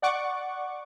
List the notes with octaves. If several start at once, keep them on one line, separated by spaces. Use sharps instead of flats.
D5 F#5 C#6 D6